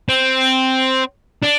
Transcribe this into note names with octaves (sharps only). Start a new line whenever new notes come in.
C4
D4